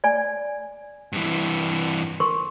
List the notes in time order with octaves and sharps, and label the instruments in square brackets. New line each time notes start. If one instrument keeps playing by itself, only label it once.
[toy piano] D5 G#5
[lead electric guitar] G2 E3
[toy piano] A#4 [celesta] C6 C#6